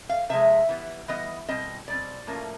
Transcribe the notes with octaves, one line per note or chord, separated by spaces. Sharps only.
F5
C3 F3 G#3 E5
E3 G3 B3
E3 G3 B3 D#5
B2 G3 C4 D#5
B2 G3 C4 D5
A2 F3 A#3 C#4